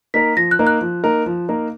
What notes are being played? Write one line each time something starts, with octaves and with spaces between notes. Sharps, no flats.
A#3 D#4 A#4 B6
F3 A#6
F#6
A#3 D#4 A#4
F#6
F3
A#3 D#4 A#4
F3
A#3 D#4 A#4